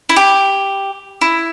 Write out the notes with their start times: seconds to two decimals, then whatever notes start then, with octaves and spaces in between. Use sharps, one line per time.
0.09 E4
0.16 G4
1.21 E4